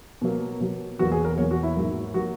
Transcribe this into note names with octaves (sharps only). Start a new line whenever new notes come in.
B2 F#3 A#3
B2 F#3 A#3
E2 B2 F#3 A#3 F#4
G#4
A#4
E2 B2 F#3 A#3 C#5
F#4
E4
G#2 F#3 A#3
F#3 A#3 F#4